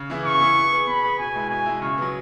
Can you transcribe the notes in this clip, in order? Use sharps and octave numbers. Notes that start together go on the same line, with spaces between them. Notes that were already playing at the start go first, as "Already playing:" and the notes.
Already playing: C#3
E3 B3 E4 G#4
C#3 C#6
E3 B3 E4 G#4
B3
G#4 B4
B3 B5
G#4 B4
B2 G#5
G#3 E4
B2 G#5
G#3 E4
C#3 C#6
F#3 B3